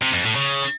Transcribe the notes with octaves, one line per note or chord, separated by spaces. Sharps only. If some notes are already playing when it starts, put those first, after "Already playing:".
C3
F2
A2
C#3